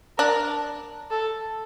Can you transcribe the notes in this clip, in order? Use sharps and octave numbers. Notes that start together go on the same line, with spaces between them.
D4 A#4
A4